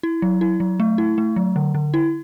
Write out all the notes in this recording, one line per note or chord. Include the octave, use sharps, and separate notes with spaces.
E4
F#3
E4
F#3
A3
E4
A3
F#3
D3
D3
E4